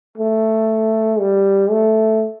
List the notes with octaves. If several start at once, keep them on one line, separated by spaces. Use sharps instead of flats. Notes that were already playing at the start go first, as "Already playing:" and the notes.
A3
G3
A3